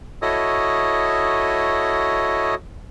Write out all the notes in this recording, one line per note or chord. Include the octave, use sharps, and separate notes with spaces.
E4 F#4 A4 C#5 D#5 D#6